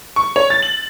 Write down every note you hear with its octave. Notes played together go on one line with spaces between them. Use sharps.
C#6
C#5
A6
F#7